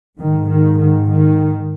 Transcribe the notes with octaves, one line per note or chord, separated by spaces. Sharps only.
G#2 D#3
D#3
D#3
D#3